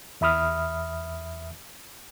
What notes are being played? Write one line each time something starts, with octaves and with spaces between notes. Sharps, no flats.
E2 E5 B5 D#6 F6